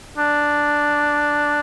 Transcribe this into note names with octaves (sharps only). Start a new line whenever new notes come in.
D4